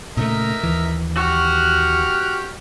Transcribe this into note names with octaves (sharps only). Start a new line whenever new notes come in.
A#2 C#3 A3 D#4 A#4 E5
D#2 E3
F#4 G4 F6